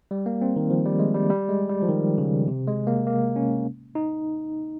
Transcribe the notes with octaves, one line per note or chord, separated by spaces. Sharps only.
G3
A#3
C4
D#3
F3
G3
G#3
G3
G3
G#3
G3
F3
D#3
C#3
C3
G#3
A#3
A#3
C#4
D#4